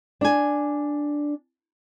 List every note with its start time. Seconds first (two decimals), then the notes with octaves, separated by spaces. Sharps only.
0.21 D4 G#5